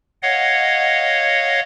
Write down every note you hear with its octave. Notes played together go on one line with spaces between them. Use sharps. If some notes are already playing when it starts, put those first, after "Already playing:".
C#5 D#5 F5 F#5